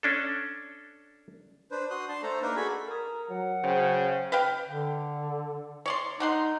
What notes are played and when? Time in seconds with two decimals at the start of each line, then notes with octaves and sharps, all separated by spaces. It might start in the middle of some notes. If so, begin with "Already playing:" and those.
0.03 C#4 D4 A4
1.71 D4 B4 C5
1.90 F#4 C6 D#6 F#6
2.08 D4 A5 C6
2.23 A3 A4 C5 A#5
2.42 A#3 D4 D#4 A#4 B4
2.56 F#4 G#4 A4 G#5 B5
2.87 A#4 A#5 D#6
3.29 F#3 F#5
3.64 C#3 F#3 C5 G5
4.32 B4 F5 G5
4.69 D3
5.86 C#5 D5 C6
6.20 D3 D#4 F#5 C6